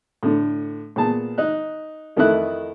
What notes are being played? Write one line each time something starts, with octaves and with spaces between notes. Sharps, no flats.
A2 D3
A#2 B3 G#4 A5
D#4 F#6
F2 D#3 A3 D#4 E4 F#6